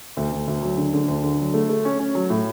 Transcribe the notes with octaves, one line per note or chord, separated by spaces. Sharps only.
D2
D2
D2
F#3
D3
D3
D2
D3
F#3
A3
A3
C#4
C#4
F#3
A2